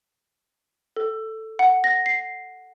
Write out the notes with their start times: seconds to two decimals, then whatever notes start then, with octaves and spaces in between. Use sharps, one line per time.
0.96 A4
1.59 F#5
1.84 A#6
2.06 C7